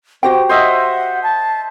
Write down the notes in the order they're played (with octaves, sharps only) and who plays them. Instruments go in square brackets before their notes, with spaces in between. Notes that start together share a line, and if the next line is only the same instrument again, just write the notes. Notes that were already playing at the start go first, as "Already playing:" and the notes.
[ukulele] F#4 G4 G5 [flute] C5
[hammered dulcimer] C5 D#5 E5 [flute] F#5
[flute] A5